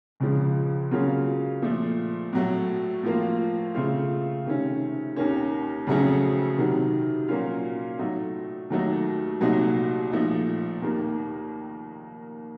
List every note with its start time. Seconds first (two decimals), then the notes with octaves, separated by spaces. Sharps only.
0.20 C#2 C#3 F3
0.91 C#3 F#3 A#3 C#4 F4
1.62 A#2 F3 A3
2.33 A2 F#3 A3
3.03 A2 F3 A#3 F4
3.75 C#3 A3 C4 F4
4.45 C3 D#3 A3 C#4
5.16 D#2 D#3 A#3 C#4
5.87 F2 C#3 F#3 A3 C#4
6.58 C3 D#3 F#3
7.28 A#2 F#3 A#3 C#4 F4
7.99 A2 F#3 A3 D#4
8.70 D#2 D#3 F#3 A3 D#4
9.41 C2 A#2 F#3 A3 D#4
10.12 A#2 F3 A3 D#4
10.82 D#2 D#3 A#3